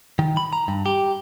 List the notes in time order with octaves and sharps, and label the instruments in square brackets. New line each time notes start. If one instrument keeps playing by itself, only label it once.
[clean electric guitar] D#3
B5
A#5
G2
G4